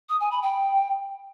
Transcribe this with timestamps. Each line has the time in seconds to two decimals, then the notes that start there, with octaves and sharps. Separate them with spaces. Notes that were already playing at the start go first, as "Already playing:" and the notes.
0.09 D#6
0.20 G#5
0.31 B5
0.43 G5